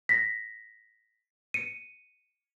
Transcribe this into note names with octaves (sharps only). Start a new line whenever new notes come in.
A#6 B6
C#7 D#7